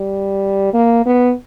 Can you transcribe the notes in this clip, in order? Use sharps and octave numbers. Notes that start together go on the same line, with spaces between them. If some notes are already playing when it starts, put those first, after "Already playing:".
Already playing: G3
A#3
B3